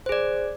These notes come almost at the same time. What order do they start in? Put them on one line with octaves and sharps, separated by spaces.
C5 G#4 D5